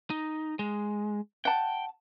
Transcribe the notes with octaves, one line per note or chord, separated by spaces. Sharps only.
D#4
G#3
F#5 G5 A5